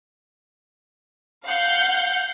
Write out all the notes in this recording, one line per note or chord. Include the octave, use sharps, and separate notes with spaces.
F5 F#5 G6